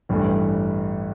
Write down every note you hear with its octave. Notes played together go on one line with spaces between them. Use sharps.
A1 G2 E3 A3